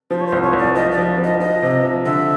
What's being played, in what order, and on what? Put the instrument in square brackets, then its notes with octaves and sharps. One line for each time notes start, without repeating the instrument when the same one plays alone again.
[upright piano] F3 [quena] C5
[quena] C#5
C5
[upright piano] C2
[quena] C#5
[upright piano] C2
[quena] D5
[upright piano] F3 [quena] D#5
[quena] D5
[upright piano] F3
F3
[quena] D#5
[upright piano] F3 [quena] D#5
[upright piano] C3
F3
[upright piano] D3 [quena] E5